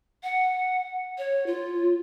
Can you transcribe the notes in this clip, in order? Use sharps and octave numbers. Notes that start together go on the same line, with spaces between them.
F#5
C#5
F4